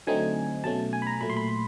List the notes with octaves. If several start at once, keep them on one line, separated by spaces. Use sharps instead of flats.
D3 F#3 A3 C4 D#4 G#5
B2 F#3 A3 C#4 A5
G#5
B5
A#5
A#2 F#3 A3 B5
C6
B5